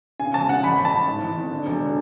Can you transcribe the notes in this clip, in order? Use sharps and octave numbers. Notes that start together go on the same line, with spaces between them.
C#3 G#5
E1 A5
C#3 F#5
A1 B5
A1
A5
A1
G#2
E3
G#1
D3
E1
D3